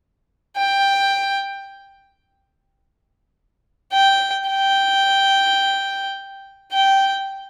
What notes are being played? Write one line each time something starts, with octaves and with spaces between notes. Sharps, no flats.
G5
G5
G5
G5